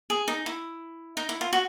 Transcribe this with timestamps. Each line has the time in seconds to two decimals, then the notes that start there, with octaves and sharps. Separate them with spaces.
0.10 G#4
0.28 D#4
0.46 E4
1.17 D#4
1.29 E4
1.41 F4
1.53 F#4